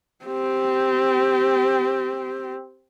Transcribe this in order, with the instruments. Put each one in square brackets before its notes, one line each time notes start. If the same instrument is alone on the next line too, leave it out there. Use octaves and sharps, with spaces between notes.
[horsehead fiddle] C4 G4